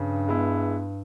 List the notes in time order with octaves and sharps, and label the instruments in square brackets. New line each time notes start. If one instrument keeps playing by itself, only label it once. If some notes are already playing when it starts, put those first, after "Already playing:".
Already playing: [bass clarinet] G2 [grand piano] C#3
[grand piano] G#3 B3 E4